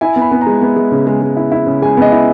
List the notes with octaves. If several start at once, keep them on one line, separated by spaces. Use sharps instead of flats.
E4 G#5
B3
B5
B3
A#5
G#3
B3
G#3
C#3
G#3
G#3
E4
E4
C#3
G#3 G#5
B3 D#5
E4